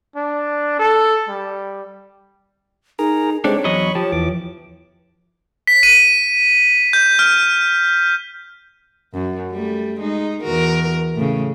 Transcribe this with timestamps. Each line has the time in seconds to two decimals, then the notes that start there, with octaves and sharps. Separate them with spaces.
0.16 D4
0.79 A4
1.29 G3
2.99 D#4 G#4 A#4 A#5
3.44 G3 G#3 C4 D4 A4 C#5
3.64 E2 F#3 D#5 B5 C#6
3.95 F3 G4 A5
4.12 E2 E3 D6
5.67 B6
5.83 D#7
6.93 G6
7.19 F6
9.13 F#2
9.51 G3 A3
10.00 G#3 D#4
10.43 E2 F#4 A#4
11.15 A2 C#3